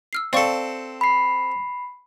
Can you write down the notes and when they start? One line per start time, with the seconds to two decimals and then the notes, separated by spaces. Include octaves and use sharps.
0.13 E6 F6 C7
0.33 C4 A4 D5 F5 C#6
1.01 B5 C7